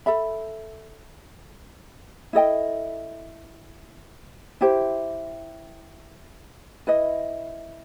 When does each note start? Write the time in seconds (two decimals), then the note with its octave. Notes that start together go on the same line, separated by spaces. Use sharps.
0.06 A4 E5 B5
2.33 E4 A4 D#5 G5
4.61 E4 G4 C5
6.87 E4 B4 D#5